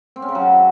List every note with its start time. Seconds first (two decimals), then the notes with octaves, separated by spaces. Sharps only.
0.16 C4
0.22 C#4
0.29 C#3
0.35 F#3
0.41 C#3